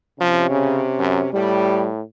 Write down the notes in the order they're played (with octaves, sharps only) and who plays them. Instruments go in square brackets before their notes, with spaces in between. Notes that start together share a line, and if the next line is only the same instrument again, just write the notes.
[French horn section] C3 C#4 [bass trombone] F3
[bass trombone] C#3
F#2
[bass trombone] A2 [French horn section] G3